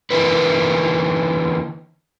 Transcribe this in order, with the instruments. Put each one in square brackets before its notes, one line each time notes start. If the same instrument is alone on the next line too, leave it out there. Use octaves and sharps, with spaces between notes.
[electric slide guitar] D3 E3 A#3 D#4 B4